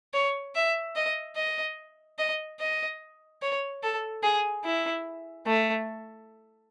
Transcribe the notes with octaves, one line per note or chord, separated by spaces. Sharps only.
C#5
E5
D#5
D#5
D#5
D#5
C#5
A4
G#4
E4
A3